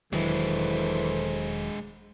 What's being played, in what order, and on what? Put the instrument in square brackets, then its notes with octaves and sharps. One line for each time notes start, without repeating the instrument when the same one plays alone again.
[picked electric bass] E1 D#3 F#3 [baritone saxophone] E3 [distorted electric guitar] G#3 D4 [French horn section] A4 C5